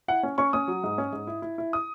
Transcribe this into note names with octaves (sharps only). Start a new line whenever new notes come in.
E4 F#5
C#4
C#4 C#6
C#4 D#6
F#3
G#2
C#4
G#2
E4
E4
E4
D#6